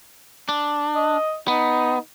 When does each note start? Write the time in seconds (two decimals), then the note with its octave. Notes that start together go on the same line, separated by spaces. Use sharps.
0.49 D4
0.95 D#5
1.48 B3 D#4